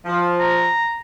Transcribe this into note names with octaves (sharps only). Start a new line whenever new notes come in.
F3
A#5